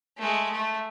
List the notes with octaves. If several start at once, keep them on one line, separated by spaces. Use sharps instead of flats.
G#3 A3
A3